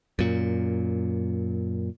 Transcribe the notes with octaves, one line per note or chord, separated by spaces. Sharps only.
F#2 A#2